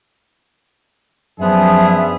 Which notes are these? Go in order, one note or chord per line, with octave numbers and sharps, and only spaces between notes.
F#2 F3 B3 D4 G#4 E5